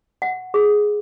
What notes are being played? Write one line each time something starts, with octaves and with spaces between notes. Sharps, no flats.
F#5
G#4